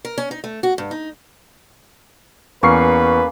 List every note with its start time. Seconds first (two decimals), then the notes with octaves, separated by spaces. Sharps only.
0.05 A#4
0.18 C#4
0.31 D#4
0.44 A3
0.63 F#4
0.78 G2
0.91 D#4
2.63 E2 A#3 C#4 B4 C#6 C7